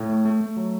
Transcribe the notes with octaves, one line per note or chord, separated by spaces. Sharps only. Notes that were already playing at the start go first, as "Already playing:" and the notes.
Already playing: A2
A3
A3
A3
F#3